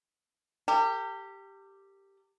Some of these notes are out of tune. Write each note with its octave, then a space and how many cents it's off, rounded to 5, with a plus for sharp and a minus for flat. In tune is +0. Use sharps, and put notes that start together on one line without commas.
G4 +0 A#4 -45